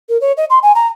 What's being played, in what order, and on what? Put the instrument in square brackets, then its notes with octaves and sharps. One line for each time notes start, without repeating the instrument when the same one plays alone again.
[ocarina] A#4
C#5
D#5
C6
G#5
A#5